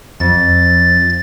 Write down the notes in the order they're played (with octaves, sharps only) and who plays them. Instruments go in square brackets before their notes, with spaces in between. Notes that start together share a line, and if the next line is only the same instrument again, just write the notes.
[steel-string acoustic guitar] F2 [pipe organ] A6